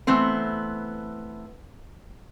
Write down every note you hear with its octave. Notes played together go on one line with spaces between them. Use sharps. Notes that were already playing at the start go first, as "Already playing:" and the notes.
E3 A3 B3 C4